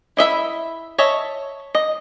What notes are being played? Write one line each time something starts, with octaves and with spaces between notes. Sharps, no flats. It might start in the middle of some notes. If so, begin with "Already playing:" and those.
E4 D#5 E5 B5
C#5 D#5 E5 A5
D#5